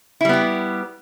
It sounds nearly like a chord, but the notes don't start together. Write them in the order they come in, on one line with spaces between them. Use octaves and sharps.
E4 G3 B3 G4